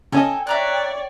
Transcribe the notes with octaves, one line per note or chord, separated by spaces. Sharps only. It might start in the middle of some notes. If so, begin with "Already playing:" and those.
C#3 C#4 A4 D#5 G5 G#5
C#5 D5 E5 A#5 F#6